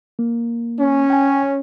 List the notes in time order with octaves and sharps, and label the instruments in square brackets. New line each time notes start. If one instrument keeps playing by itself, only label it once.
[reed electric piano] A#3
[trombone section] C#4
[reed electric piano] G5 G#5